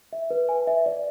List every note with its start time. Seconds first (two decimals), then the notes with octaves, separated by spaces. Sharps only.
0.13 E5
0.31 B4
0.49 G#5
0.67 E5
0.86 D5